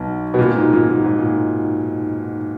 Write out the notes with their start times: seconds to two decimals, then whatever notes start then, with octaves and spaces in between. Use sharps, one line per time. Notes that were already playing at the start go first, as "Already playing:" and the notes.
Already playing: B1 B2
0.34 B2
0.39 A#2
0.55 G#2
0.73 A#2
0.91 A#2
1.04 G#2
1.18 A#2